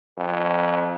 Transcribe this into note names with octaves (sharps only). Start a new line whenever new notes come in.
F2